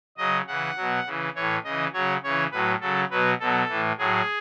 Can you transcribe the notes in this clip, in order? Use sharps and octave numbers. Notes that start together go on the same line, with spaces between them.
C#3 F#3 D#5
C#3 E3 F#5
B2 F#3
C#3 E3
A2 E3 C#5
C#3 E3 D#5
C#3 F#3 C#5
C#3 E3 C#5
A2 F#3 B4
C#3 F#3 A4
B2 F#3 B4
B2 F#3 A4
A2 E3
A2 F#3 G#4